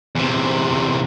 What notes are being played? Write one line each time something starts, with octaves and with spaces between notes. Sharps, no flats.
E2 C3